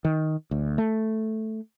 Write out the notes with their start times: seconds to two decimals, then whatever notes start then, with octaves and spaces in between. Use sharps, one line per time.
0.05 D#3
0.51 D2
0.78 A3